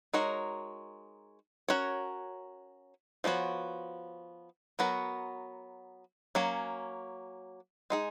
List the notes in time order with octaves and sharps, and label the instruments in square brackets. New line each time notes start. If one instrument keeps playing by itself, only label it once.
[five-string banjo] G#3 D#4 F#4 A#4 C#5
C#4 F#4 A#4 C#5
F3 G#3 B3 F#4 C#5
F#3 B3 F#4 A#4
F#3 A#3 C#4
G#3 D#4 G#4